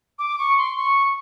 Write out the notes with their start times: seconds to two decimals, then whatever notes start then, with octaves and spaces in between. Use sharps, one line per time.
0.19 D6
0.39 C#6
0.58 C6
0.77 C#6